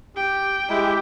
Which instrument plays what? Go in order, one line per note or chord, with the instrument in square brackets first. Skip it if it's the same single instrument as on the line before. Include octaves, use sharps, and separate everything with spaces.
[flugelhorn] G4 [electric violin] G5
[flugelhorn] G#3 [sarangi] E4 [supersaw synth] G4